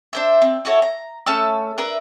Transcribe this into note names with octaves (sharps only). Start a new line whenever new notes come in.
D4 C5 E5
C4
E4 F#4 A4 C#5
A#5
A3 C#4 A5 E6
D4 A#4 B4 E5